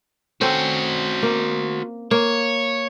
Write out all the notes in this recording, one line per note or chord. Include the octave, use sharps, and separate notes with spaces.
C4 C#4 F#4 A4 C5
A#3
A#3 C#5